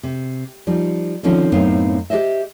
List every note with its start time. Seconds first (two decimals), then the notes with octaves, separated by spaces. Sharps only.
0.03 C3
0.67 F3 G3 D#4
1.23 D3 D#3 F3 C4 C#4 D#4
1.52 F#2 A2 B3 C4 D#4 F5
2.10 G4 G#4 C5 D#5 E5